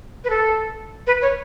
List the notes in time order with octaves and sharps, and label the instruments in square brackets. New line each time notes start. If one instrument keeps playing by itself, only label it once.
[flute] B4
A4
B4
C#5